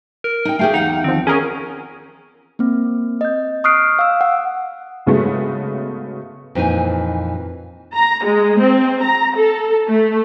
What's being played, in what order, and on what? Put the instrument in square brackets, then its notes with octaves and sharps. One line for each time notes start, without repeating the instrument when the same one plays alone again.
[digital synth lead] A#4
[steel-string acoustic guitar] D#4 G5
[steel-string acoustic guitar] A3 G4 G#4 [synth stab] F5 G5
[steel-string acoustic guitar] E2 F#5 [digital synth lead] D#4
[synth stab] D#3 F3 [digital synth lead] C4
[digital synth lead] C#4 [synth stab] G#4 A#4 C#5
[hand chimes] A#3 C4
D#5 G6
C#6 D#6 F6 F#6 C7 D7
F5 E6
F#5
[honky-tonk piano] G#2 C#3 F#3 G#3 A3 B3
[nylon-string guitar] F2 A#2 E3 D#4 G#5
[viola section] A#5
G#3
C4
A#5
A4
A3